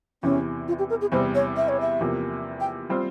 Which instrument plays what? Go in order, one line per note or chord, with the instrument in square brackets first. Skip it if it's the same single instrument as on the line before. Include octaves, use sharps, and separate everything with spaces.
[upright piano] E2 C3 E3 [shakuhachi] C#4
[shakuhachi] F4
G4
A#4
G#4
[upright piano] E2 C3 E3 G3 [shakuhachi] C5
[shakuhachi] C#5
E5
C#5
E5
[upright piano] E2 C3 F3 A#3
[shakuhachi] G5
[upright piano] G3 C4 F4 C5